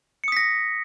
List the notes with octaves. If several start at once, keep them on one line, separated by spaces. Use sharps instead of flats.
D#6 A#6 B6 C#7